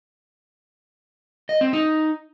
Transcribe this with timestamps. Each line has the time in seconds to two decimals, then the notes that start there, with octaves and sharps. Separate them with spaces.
1.49 D#5
1.61 C4
1.73 D#4